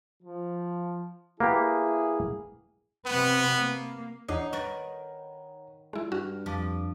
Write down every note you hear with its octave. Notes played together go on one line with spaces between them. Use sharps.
F3
A#3 B3 E4 G4 G#4
C3 B3 B4
A#3
E2 D4 D#4 C#5 F#5 A#5 C7
D#3 A#4 B4 C#6 A6
G3 G#3 E4 F4
G2 F#4 F6
F2 F3 D6